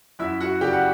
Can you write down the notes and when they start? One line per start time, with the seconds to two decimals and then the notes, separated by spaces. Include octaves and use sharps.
0.19 F#2 E4 E5
0.40 F#4 F#5
0.61 C#3 G3 G4 G5
0.73 F#5